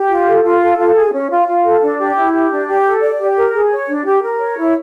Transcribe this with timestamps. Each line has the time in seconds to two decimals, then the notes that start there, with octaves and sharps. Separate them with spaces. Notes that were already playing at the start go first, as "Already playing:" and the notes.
Already playing: G4
0.09 F4
0.26 A4
0.43 F4
0.61 A4
0.78 F4
0.95 G#4
1.13 C#4
1.30 F4
1.47 F4
1.65 A4
1.82 D4
1.99 G4
2.16 E4
2.33 G4
2.50 D4
2.68 G4
2.85 A4
3.02 D5
3.19 G4
3.37 A#4
3.54 G#4
3.71 C#5
3.88 D4
4.06 G4
4.23 A#4
4.40 C#5
4.57 E4